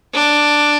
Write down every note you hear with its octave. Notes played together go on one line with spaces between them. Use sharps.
D4